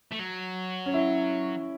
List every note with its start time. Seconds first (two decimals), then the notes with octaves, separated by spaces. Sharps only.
0.11 A3
0.19 F#3
0.86 C#4
0.94 E4